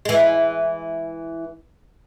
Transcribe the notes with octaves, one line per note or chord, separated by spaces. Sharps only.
E3 G#3